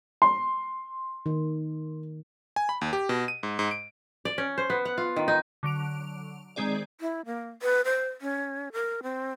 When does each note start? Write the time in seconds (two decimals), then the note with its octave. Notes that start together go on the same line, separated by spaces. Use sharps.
0.22 C6
1.26 D#3
2.56 G#5
2.69 B5
2.81 D#2
2.93 G4
3.09 B2
3.28 D#7
3.43 G#2
3.59 G#2
3.71 D7
4.25 D5
4.38 C#4
4.58 C5
4.70 B3
4.85 F#5
4.98 F4
5.16 D#3
5.28 D#4
5.63 D3 F#3 D7 F7
6.56 D#3 G#3 C4 G#4 D5
7.01 E4
7.26 A#3
7.62 B4
7.85 C5
8.21 C#4
8.73 A#4
9.03 C4